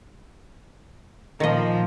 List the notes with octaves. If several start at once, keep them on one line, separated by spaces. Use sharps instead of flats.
A#2 D#3 F3 A#3 D#5